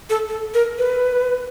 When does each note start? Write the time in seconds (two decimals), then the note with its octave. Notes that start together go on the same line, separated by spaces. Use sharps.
0.10 A4
0.29 A4
0.54 A#4
0.79 B4